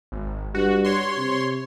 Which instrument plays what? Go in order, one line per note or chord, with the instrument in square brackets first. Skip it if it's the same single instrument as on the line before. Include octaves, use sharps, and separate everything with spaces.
[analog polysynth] G#1
[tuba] G2 [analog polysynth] F#4
[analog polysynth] C#5 C6
[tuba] C3